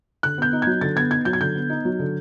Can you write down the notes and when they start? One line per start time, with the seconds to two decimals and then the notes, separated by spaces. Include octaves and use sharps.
0.23 D3 F#6
0.38 B3 G6
0.53 D#4
0.62 G#6
0.67 F#3
0.81 D3 A6
0.96 B3 G#6
1.11 D#4 G#6
1.25 F#3 G6
1.33 G#6
1.41 D3 G6
1.55 B3
1.70 D#4
1.85 F#3
1.99 D3